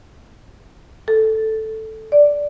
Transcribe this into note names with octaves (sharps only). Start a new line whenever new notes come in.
A4
D5